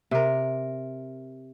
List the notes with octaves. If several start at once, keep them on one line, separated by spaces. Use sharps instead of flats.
C3 A#4